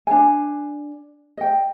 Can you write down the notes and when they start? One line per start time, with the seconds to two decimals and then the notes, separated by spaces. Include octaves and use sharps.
0.07 D4 G#5
1.37 D#5 G5